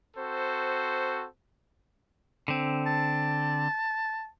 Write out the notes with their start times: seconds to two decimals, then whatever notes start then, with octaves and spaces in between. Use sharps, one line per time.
0.17 C4 F#4 A4 C5
2.48 D3 C4
2.86 A5